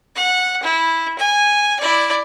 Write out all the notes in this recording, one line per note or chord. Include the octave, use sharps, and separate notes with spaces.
F#5
E4
G#5
E4 D5